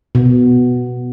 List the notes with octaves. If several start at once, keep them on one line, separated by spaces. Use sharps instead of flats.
B2